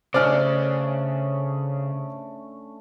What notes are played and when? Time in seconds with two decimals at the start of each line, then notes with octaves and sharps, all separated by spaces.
0.14 C#3 A3 C#4 D4 C5 D5 F6